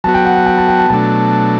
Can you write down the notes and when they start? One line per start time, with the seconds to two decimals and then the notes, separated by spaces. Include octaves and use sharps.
0.04 F#3 A5
0.07 B3 F#4
0.14 G5
0.25 F#5
0.36 G5
0.46 G5
0.58 A5
0.68 G5
0.79 A5
0.90 B2 F#3 A3 D4 A5